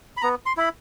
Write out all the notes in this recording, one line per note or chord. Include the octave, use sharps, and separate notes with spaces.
B5
B3 A#5
C6
E4 B5